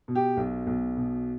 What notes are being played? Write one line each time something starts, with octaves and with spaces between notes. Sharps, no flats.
B2
G4
B1
B1
B2